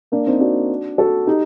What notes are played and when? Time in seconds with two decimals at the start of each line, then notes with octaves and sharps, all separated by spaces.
0.12 A#3 D4
0.27 C4 D#4
0.40 D4 F#4
0.98 F#4 A4
1.26 D#4 G4